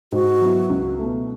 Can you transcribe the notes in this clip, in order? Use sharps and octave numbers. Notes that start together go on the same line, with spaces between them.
G#2 F#4
F#3 B3 E4
C#2
B2 A3